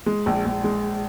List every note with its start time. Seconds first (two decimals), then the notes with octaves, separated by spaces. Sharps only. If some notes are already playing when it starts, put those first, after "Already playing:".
0.06 G#3
0.26 A#1
0.45 A#1
0.64 G#3